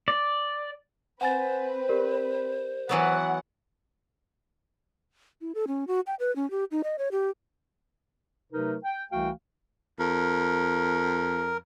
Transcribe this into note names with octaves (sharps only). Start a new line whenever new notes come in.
D5
C4 B4 C5 F#5 G#5 A6
G4 A#4 D5
E3 F#3 B3 F#5
E4
A4
C#4
F#4
G5
B4
C#4
G4
D#4
D#5
C#5
G4
C3 F#3 A3 D#4 A#4 B4
G5
C2 E3 A3 F#4 F5 G5
F2 A#4